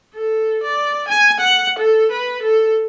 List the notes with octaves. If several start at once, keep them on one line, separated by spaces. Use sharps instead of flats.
A4
D5
G#5
F#5
A4
B4
A4